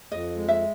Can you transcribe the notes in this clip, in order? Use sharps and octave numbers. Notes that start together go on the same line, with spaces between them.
F2 D#5
G#3
E5